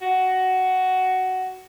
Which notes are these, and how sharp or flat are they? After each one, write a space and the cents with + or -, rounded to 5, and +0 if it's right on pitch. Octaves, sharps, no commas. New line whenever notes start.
F#4 +10